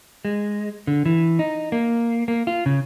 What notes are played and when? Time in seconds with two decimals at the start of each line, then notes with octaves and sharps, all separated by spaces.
0.25 G#3
0.87 D3
1.06 E3
1.39 D#4
1.72 A#3
2.28 A#3
2.47 F4
2.66 C#3